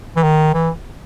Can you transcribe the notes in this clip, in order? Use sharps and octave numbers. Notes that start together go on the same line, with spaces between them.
E3
D#3
E3